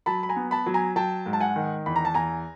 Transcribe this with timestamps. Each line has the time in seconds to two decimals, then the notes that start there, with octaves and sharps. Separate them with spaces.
0.06 F#3 A5 B5
0.23 B5
0.29 G#5 A#5
0.36 B3
0.51 A5 B5
0.66 F#3
0.74 G#5 A#5
0.96 F#3 G5 A5
1.26 G#2
1.33 A5
1.41 F#5 G#5
1.56 D#3
1.86 E2 B5
1.96 A#5
2.05 A5
2.14 E2 G#5 A#5